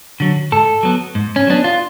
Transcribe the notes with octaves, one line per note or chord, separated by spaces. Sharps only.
D3 F#3
G#2 A4
F#3 B3
G#2
C#4
F#3 B3 D4
F4